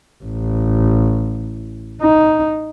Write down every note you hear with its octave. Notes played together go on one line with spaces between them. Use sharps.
A1
D#4